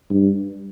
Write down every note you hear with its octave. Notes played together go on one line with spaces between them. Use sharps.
G2